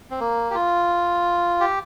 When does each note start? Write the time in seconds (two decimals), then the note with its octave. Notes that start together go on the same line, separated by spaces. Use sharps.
0.11 C4
0.20 A#3
0.50 G4
0.55 F4
1.61 G4